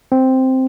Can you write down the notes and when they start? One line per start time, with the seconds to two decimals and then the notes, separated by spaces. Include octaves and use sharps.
0.12 C4